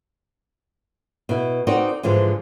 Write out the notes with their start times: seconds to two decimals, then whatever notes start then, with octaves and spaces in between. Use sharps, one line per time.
1.29 B2 E4
1.67 C4 D#4 F#4 A#4 D5
2.03 G#2 D3 E3 F3 G#3